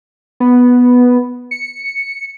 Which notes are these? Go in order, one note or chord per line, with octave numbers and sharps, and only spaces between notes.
B3
C#7